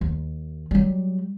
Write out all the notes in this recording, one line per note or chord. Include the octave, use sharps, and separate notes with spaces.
D#2
F#3 G3